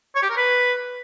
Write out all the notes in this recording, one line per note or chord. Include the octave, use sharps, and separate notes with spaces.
C#5
G4
A#4
B4